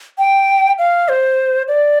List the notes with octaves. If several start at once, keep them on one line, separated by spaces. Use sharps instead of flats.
G5
F5
C5
D5